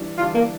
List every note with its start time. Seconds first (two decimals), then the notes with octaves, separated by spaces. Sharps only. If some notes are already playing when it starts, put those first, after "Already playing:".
Already playing: E3 G3 D4
0.18 E3 G3 D4 F4
0.35 A#3